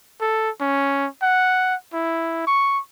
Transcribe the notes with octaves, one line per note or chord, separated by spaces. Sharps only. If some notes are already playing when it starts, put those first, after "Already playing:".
A4
C#4
F#5
E4
C#6